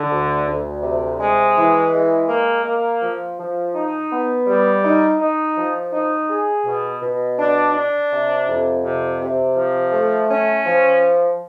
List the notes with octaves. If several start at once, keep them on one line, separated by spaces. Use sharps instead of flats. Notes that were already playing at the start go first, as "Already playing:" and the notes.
Already playing: D3
D2
D2
C3
G#3
E3
G#3
A#3
A#3
F3
F3
D#4
B3
G3
D#4
D#4
F3
D#4
G#4
B2
B2
D4
D4
C3
F2
C3
C3
F3
A3
C#4
F3